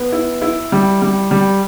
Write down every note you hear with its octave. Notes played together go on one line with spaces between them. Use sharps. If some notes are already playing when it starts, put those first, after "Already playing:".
Already playing: B3
E4
E4
G3
G3
G3